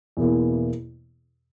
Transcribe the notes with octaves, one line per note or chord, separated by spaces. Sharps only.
E2 B2 A#3 E4